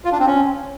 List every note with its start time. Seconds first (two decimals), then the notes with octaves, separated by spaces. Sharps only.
0.05 F4
0.12 D4
0.19 C4
0.27 C#4